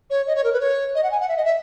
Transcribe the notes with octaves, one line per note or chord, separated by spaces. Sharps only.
C#5
D#5
C#5
A#4
B4
C#5
D#5
F#5
G#5
F#5
E5
D#5
E5